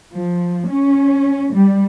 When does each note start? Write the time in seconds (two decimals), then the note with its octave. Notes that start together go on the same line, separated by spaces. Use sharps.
0.14 F3
0.69 C#4
1.53 G3